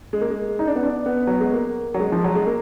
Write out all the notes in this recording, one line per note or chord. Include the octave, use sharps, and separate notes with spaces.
G#3
A#3
G#3
D#4
D4
B3
D4
B3
F#3
G#3
A#3
F#3
G#3
F3
F#3
G#3
A#3